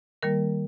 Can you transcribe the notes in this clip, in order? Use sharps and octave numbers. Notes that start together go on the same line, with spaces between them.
D#3 G3 A#3 A#4